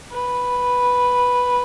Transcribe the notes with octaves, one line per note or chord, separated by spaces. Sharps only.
B4